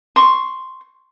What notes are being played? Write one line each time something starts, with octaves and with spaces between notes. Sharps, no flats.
C6 C#6